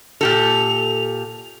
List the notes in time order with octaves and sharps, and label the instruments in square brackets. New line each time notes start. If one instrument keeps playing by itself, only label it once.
[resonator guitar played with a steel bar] A#2 G4 A4 [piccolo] F7